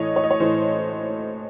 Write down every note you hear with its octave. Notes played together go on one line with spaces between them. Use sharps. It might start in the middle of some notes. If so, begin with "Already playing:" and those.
Already playing: A2 E3 C#5 D#5
C#5
D#5
C#5
A2 E3 C5